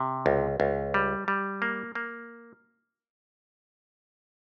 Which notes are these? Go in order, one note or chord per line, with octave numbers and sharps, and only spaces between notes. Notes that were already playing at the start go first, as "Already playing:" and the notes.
Already playing: C3
C#2
C#2
G3
G3
A#3
A#3